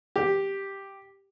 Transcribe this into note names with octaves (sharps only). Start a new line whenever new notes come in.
G4